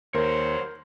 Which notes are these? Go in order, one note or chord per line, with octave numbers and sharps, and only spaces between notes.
D#2 G3 A#4 C5 C#5